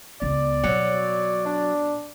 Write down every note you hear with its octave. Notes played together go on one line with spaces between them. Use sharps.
C#2 B3 D5
B2 F#3
D4